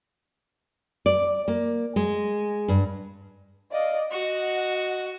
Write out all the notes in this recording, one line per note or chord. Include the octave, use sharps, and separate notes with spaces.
D5
A#3
G#3
G2
D5 D#5 F5
F#4 D#5 F#5